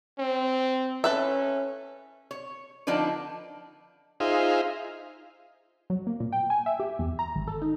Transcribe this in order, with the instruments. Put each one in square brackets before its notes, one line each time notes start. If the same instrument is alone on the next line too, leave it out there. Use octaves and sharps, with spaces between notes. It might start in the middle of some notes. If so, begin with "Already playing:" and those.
[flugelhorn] C4
[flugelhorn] C#4 [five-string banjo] A4 B4 E5
[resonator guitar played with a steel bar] C#5
D3 F3 D4 D#4 B4
[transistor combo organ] D#4 F4 G#4 C5 E5 F5
[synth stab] F#3
A#3
A#2
G5
G#5
E5
G4
E2
A#5
G#1
A4
D#4